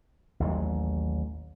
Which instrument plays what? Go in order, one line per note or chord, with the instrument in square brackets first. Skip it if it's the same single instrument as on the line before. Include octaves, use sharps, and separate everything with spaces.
[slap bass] A1 D#2 F#3